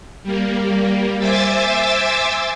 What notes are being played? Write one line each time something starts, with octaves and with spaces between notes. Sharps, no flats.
G3 A#3
C5 E5 G#5 D6 E6 A6